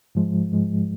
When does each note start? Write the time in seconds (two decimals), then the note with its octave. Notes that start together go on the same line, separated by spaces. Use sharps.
0.15 G#2 F3 G#3
0.52 G#2 F3 G#3